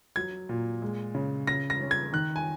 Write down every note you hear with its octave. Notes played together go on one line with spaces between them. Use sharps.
F#3 G#6
A#2
G#3
C#3
C#3 A#6
A#6
C#4
G#6
D#3 F#6
G#5